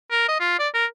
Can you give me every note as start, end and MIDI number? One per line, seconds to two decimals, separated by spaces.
0.11 0.26 70
0.28 0.37 75
0.40 0.59 65
0.59 0.68 74
0.74 0.85 70